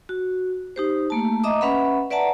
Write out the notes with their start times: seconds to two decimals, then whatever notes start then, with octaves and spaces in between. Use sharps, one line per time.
0.09 F#4
0.76 D#4 G4 C5
1.10 A3 A#3 A5
1.43 D#5 E5 A#5 D6 D#6
1.61 C#4 B4 E5 F#5 B5
2.10 B4 D5 E5 F#5 A5 A#5